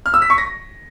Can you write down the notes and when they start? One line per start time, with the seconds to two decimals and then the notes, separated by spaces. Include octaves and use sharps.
0.06 F6
0.14 E6
0.22 B6
0.30 C#6
0.38 A#6